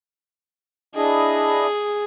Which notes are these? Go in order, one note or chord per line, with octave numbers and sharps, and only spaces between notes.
D4 E4 G#4 D#5